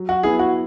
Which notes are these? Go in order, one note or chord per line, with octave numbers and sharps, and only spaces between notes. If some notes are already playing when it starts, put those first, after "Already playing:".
Already playing: F#3
F#4
B3 E4 G#4
F#4